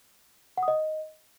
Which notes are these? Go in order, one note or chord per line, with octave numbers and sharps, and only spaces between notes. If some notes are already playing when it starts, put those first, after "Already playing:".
F#5
D#6
D#5